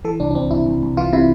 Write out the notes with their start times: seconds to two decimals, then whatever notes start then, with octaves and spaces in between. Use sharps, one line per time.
0.05 E3 A4
0.20 C2 D4
0.31 D4
0.35 C2 C4
0.51 C2 E4
0.66 C2
0.83 C2
0.97 E3 F4
1.13 C3 E4